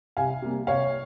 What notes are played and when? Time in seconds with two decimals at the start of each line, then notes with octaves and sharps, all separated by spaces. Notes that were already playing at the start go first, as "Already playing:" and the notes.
0.17 C2 F5 G#5
0.42 C3 G3 A#3
0.67 C2 C#5 F5